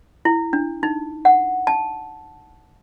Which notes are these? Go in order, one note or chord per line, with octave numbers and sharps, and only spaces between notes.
E4
D4
D#4
F#5
A5